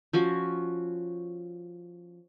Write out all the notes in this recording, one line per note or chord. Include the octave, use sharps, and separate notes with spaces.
F3 C#4 F#4